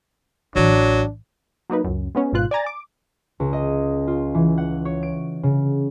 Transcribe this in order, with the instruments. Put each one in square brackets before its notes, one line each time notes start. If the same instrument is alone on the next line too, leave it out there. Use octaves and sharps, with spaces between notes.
[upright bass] A1 E3 [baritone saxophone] F#3 [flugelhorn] D4
[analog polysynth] F#3 A#3 D#4 B4
C#2 F#2
G#3 B3 C#4
G#1 G#2 B2 F4 F#6
D5 G#5 A#5 A6
D6
[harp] C#2
D#5
F4
E3
F#5
C#5
D7
C#3